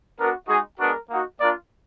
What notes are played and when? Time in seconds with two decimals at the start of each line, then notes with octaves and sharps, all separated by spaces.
0.18 B3 D4 F#4 A#4
0.48 G#3 D#4 F#4 G#4
0.79 G#3 B3 D4 F#4 A#4
1.10 A#3 D#4 F#4
1.40 A#3 D4 F4 A#4 D5